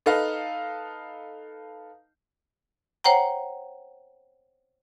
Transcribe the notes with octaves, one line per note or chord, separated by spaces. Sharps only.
D#4 A4 B4 D#5 F5
C5 C#5 F#5 G5 A#5